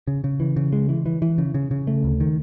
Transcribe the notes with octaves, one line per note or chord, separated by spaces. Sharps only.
C#3
C#3
E3
C#3
G#3
E3
E3
E3
C#3
C#3
C#3
A3
D2
D#3